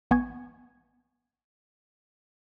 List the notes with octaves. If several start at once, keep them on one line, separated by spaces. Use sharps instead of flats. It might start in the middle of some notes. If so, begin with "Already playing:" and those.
A1 B3 G#5 C#6 G#6